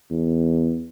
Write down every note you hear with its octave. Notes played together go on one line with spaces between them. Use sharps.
E2